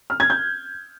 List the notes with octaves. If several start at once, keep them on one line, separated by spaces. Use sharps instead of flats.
F6
G#6
G6